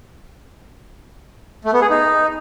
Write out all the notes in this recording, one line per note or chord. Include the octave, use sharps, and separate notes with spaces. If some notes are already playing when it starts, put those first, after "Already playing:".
A3
B3
G#4
D#4